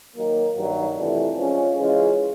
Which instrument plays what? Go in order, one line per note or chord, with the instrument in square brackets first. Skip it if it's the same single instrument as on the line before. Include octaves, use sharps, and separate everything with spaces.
[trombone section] D#3 F#3 A#3
G2 D#3 F#3
F2 C3 E3 A3 D4
F3 G#3 C#4
C#3 E3 G#3 C#4 F4